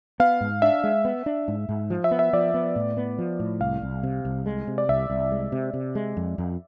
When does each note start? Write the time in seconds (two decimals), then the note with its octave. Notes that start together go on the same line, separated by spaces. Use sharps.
0.20 B3 F5
0.41 G#2
0.62 D4 E5
0.84 G#3
1.05 B3
1.26 D4
1.48 G#2
1.69 G#2
1.90 F3
2.04 E5
2.11 B3
2.19 E5
2.33 F3 D5
2.54 B3
2.76 A2
2.97 B3
3.18 F3
3.40 A2
3.61 C2 F5
3.82 C2
4.03 C3
4.25 C2
4.46 G#3
4.67 C3
4.78 D5
4.89 C2 E5
5.10 C2
5.32 G#3
5.52 C3
5.74 C3
5.95 G#3
6.17 F2
6.38 F2